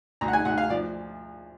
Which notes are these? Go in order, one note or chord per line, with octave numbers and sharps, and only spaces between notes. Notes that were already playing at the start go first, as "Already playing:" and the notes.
D2 A#5
F#5
G#5
D2 F#5
F5
F3 D5